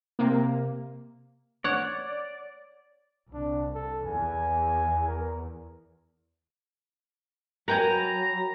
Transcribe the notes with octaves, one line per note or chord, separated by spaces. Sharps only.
C3 A#3
C#5 D5 F#5
C2 D4
A4
E2 G#5
A#4
F#3 A#4 B4 G5 G#5 A#5